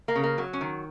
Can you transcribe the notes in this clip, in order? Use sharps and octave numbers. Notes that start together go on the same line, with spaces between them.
A#3
C#3
A#3
F#3
C#4
D#3